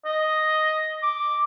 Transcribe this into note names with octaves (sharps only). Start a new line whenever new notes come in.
D#5
D6